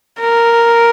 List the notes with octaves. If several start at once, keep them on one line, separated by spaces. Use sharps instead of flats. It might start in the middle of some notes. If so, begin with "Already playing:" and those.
A#4